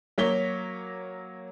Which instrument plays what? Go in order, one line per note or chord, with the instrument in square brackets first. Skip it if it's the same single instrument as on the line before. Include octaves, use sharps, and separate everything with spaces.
[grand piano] F#3 A#3 C#5 B6 G7